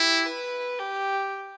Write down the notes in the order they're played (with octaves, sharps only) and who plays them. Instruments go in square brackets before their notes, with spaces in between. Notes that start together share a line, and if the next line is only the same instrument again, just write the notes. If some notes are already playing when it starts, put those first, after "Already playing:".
Already playing: [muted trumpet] E4 [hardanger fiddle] G4
[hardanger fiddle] B4
G4